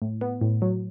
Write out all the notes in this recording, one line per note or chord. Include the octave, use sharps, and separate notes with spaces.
A2
B3
A2
F#3